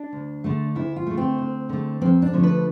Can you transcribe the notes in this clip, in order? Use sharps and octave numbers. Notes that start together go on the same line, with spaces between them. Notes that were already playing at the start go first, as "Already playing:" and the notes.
Already playing: D4
D2
D3 A3
D2 E4
F4
D3 A3
C4
D2
D3 A3
F2 C4
D4
D3 F3 A3
B4